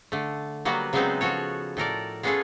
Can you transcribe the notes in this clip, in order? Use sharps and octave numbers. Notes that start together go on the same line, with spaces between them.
D3 A3
F#3 G3 A#3 B3 F#4
C#3 F#3 G#3 B3 C4 D#4
F3 F#4 A4 C#5
A2 A4 A#4 D5
G#3 B3 C#4 F4 G#4 A4